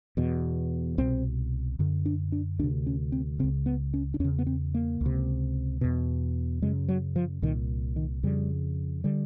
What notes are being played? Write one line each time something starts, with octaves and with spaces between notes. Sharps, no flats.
E2 B2
C2 B2 C4
F#2 D3
D4
D4
D2 C3 D4
C#4
C4
C#2 C#3 C4
B3
C#4
D4
E2 C#3 C#4
B3
C4
A#3
C#2
C3
E2 B2
F#2 C#3 G#3
F#3
F3
C2 A#2 D#3
D#3
F2 C#3 G3
D3 G3